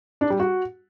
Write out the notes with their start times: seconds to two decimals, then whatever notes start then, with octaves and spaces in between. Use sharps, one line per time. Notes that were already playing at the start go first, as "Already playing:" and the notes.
0.21 D4
0.30 G3
0.40 F#4